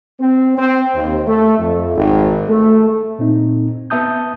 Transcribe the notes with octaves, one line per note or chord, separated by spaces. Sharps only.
C4
C4
D#2
A3
F2
G#1
A3
A#2 C4 D#4
B3 E5 A5 D#6 G6